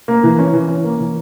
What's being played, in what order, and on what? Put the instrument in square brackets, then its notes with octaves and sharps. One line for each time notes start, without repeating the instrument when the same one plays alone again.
[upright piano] A#3
E3
C#4
E3
C#4
A#3
E3